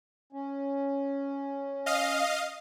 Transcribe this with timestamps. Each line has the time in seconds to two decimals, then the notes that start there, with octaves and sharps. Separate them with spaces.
0.33 C#4
1.86 D#5 F5